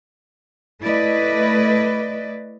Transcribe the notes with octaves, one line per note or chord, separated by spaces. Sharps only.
A3 E4 B4 D5 D#5